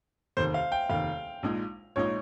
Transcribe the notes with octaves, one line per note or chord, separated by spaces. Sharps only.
F1 D#2 D#3 C5
F5
G5
F1 D#2 D#3 F5
A#1 A#2 G#3 D#4
A#1 A#2 G#3 D#4 C#5